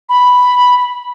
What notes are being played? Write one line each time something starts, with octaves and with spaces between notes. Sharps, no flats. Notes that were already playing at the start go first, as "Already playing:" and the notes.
B5